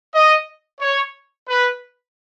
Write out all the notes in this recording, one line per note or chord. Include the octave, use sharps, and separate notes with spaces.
D#5
C#5
B4